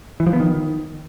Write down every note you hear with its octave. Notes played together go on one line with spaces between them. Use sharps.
E3
F3
B3
D#3